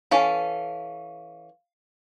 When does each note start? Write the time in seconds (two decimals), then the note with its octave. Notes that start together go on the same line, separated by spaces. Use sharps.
0.11 E3 C#4 A4 F5